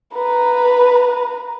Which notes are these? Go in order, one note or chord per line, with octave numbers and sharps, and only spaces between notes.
B4 A#5